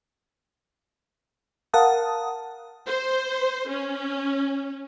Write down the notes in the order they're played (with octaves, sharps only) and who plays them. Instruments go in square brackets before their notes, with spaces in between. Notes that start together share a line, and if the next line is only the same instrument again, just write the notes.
[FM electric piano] A#4 F5 F#5 A5 D#6
[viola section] C5
C#4